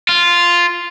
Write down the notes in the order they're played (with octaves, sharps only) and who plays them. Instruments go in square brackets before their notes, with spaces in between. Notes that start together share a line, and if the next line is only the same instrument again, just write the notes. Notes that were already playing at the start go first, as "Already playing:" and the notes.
[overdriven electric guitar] F4